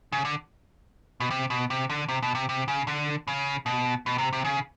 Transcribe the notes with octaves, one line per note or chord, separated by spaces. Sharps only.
C#3
D3
B2
C3
B2
C3
D3
C3
B2
C3
C3
C#3
D3
C#3
B2
B2
C3
C3
C#3